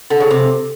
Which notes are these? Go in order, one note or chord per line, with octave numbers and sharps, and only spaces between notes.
D3
C#3
C3